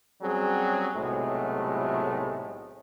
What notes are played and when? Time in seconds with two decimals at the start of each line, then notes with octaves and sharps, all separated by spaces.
0.22 F#3 G3 C4 C#4 G#4
0.95 B1 A2 C3 F#3 G#3 A3